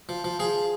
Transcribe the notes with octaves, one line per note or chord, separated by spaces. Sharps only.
F3
F3
F3 G#4